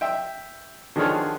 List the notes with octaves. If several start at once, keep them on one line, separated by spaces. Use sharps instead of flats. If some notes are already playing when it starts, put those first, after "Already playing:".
E5 G5
D3 D#3 F3 G#4 C#5 F6